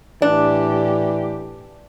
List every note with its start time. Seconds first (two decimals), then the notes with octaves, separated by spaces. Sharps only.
0.22 A2 E3 D4 G4 D5